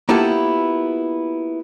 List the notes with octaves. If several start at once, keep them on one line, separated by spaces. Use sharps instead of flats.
A#3 B3 E4 F4 G4 A4